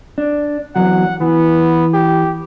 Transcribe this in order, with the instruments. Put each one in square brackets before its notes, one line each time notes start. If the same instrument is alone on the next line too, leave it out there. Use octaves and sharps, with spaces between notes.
[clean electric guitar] D4
[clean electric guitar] E2 F#3 [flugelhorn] F#5
[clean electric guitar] E3 [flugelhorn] B3
[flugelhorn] G4